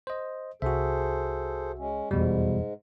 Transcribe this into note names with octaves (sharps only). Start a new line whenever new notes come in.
C5 D#5
C2 F#4 G#4 A4 C5 E5
G#3 C#4
F1 E2 G#2 B2 G3 G#3